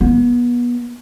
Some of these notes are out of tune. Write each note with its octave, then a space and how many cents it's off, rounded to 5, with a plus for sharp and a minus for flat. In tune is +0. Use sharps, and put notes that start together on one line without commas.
B3 -30